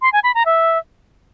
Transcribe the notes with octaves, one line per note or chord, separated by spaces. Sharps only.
C6
G#5
B5
A#5
E5